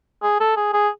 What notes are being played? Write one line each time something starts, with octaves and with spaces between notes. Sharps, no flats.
G#4
A4
G#4
G#4